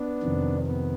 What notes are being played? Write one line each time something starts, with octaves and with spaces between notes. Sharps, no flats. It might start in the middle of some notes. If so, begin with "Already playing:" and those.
Already playing: B3 D4
F2 C3 D#3
B3